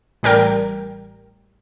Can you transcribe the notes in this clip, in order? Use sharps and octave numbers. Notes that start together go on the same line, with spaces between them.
A1 G3 A#4 G5